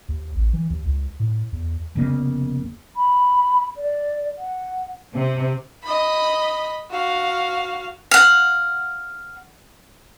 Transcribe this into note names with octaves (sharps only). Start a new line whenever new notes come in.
D#2
A1
E3
D#2
C#2
A2
E2
F1 C#3 A#3 B3
B5
D5
F#5
C3
D#5 B5
F#4 F5
F5 F#5